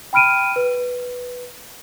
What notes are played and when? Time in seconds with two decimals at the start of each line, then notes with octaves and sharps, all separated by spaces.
0.13 G5 B5 F6 D7 D#7
0.56 B4